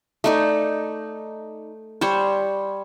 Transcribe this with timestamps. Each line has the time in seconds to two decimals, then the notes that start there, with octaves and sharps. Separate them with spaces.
0.24 A3 D#4 D5
2.01 G3 C5 C#5